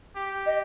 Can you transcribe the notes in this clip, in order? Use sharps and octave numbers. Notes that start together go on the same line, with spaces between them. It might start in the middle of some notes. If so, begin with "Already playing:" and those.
G4
D#5